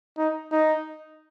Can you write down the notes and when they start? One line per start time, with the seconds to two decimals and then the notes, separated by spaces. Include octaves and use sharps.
0.18 D#4
0.52 D#4